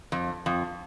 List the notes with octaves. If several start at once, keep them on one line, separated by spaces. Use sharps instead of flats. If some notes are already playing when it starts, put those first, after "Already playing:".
F2
F2